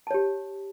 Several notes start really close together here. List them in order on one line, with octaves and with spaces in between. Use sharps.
A5 C#5 G4